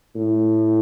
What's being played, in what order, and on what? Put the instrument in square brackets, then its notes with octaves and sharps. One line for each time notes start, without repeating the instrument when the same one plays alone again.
[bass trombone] A2